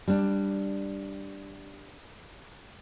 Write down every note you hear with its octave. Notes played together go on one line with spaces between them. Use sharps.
G3 D4